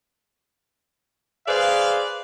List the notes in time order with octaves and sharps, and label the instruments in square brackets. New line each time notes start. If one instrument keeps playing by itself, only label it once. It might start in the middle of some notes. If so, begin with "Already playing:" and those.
[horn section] G#4 B4 C5 D5 F5